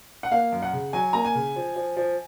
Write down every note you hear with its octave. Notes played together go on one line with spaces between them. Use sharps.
F#5
A#3 F5
F#2
F#5
C#3
F#3 G#5
A#3 A#5
G#5
C#3
F3
F3
F3